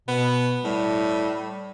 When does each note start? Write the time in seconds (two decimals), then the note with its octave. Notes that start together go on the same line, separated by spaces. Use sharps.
0.08 B2 B3
0.64 A2 G3